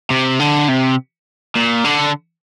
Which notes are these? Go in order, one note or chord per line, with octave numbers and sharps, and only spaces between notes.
C3
D3
C3
A#2
D3